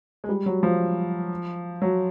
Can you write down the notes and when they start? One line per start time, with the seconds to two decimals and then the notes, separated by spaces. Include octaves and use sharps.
0.24 G#3
0.29 G3
0.46 F#3
0.63 F3
1.82 F#3